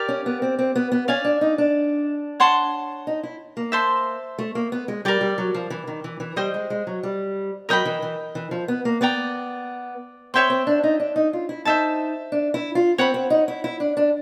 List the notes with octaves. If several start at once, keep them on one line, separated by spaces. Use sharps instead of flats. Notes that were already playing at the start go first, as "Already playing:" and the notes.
Already playing: G4 A#4 D5 F5
C#4
B3
C4
C4
B3
B3
C#4 D5 F5 G#5
D4
D#4
D4
C#5 F#5 A5 C6
D#4
E4
A#3
C5 E5 A5 C6
A3
A#3
B3
G#3
G3 A#4 D5 G5
G3
F#3
F3
E3
D#3
E3
E3
G3 C5 D#5 G5
G#3
G#3
F#3
G3
F#3 A#4 D#5 G5 B5
E3
E3
E3
F3
B3
A#3
B3 D5 G5 A#5
C4 C#5 E5 G5 C6
C4
D4
D#4
D4
D#4
F4
E4
D#4 C5 E5 A5
D4
E4
F4
C4 C#5 F#5 B5
C4
D#4
E4
E4
D4
D4